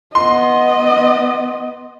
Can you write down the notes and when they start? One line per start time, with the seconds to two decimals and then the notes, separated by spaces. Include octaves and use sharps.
0.15 B3 D#5 C6